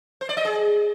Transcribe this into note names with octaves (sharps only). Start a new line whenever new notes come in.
C5
D5
D#5
G#4